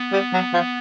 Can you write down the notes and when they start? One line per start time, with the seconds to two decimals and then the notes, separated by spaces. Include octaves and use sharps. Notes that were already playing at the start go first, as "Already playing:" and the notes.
Already playing: B3
0.12 G3
0.33 F#3
0.53 F3